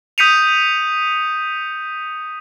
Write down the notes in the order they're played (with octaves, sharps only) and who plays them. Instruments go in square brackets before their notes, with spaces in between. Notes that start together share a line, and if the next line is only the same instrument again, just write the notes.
[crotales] D#6 G6 B6 C#7 D#7 F7